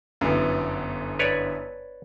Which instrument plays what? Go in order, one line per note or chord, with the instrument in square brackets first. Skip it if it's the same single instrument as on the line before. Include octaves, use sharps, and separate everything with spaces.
[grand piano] G1 F#2 [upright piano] D3 E3 B3
[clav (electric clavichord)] B4 C#5 D5